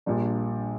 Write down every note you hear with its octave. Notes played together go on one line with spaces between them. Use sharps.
A#1 A#2 G3 D4